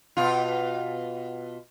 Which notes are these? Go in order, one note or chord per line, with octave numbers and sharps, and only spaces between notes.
B2 F4